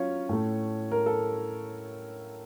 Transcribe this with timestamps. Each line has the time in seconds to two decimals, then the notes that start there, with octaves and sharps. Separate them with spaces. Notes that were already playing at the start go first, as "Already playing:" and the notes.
Already playing: F#3 C#4 F4 C#5 F5
0.29 A2 A3
0.91 A#4
1.06 A4